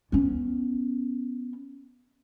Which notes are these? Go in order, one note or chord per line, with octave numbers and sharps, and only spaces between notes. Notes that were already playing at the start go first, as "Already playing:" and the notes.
B3 C#4